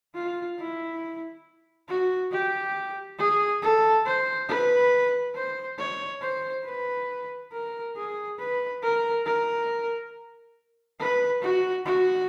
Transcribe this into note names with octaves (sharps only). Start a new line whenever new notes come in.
F4
E4
F#4
G4
G#4
A4
C5
B4
C5
C#5
C5
B4
A#4
G#4
B4
A#4
A#4
B4
F#4
F#4